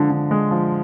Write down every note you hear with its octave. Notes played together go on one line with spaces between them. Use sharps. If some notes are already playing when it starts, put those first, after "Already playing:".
Already playing: D3 F3 G#3
D3
G#3
F3